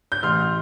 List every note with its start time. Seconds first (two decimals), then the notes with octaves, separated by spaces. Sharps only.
0.12 G6
0.23 A1 C6 F6